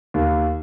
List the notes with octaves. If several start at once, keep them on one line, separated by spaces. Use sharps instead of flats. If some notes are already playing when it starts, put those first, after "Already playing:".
D#2